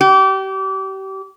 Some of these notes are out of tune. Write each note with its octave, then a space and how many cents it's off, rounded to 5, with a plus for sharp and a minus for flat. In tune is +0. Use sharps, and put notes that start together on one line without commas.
G4 -30